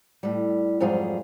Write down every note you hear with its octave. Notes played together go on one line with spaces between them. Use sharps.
A2 G3
F2 G#2 F#3 G3 F4 G#4